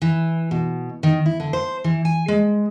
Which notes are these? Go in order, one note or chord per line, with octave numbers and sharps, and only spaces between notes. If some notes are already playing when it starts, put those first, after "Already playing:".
E3
B2
D#3
E4
D3
C5
E3
G#5
G#3